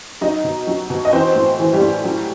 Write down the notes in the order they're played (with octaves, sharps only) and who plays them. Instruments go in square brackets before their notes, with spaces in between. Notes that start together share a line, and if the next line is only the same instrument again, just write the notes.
[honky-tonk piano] F#3 D#4 D#5
B2
F#3
B2
D#5
E3 C4 C5
A2
E3
G3 G4
A2
F#3